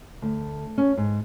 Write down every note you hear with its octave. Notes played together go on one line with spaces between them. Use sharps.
D2
C#4
G#2